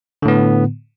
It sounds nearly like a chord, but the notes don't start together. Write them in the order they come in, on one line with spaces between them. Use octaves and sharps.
D3 A2 B3